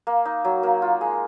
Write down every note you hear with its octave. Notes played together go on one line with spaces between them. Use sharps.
A#3
D#4
F#3
A#3
F4
G#3